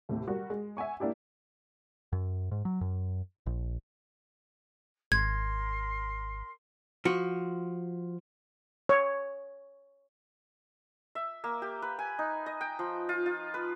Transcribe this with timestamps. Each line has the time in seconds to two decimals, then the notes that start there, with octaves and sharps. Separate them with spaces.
0.09 D#2 A2 C3
0.28 G3 F#4 A#4
0.50 G#3
0.77 E5 F#5 G#5 C#6
1.00 A#3 D4 E4 G4
2.12 F#2
2.51 G#2
2.65 F#3
2.81 F#2
3.46 A#1
5.12 G#1 A#4 C6 G#6
7.05 F3 F#4
8.89 C#5
11.15 E5
11.44 A#3
11.62 G4
11.82 B4
11.99 G#5
12.19 D#4
12.46 D#5
12.61 G5
12.79 F3
13.09 F4
13.26 F4
13.54 B4